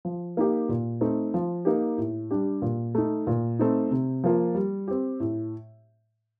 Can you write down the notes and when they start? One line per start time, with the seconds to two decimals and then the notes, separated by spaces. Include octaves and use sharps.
0.05 F3
0.37 A#3 D#4 G4
0.69 A#2
1.01 A3 C4 D#4
1.34 F3
1.65 A#3 D#4 G4
1.98 A2
2.31 G3 D4 G4
2.62 A#2
2.95 A3 D#4
3.27 A#2
3.59 A3 C4 D#4
3.91 C3
4.24 F3 A#3 F4
4.55 G3
4.88 C4 G4
5.20 A2